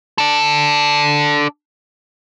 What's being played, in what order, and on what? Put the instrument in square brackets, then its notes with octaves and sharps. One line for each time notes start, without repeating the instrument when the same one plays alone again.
[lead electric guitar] D4 A4